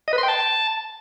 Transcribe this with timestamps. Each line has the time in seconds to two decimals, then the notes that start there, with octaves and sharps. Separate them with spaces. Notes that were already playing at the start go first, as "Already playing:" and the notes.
0.08 D#5
0.13 B4
0.18 C6
0.23 G5
0.28 A5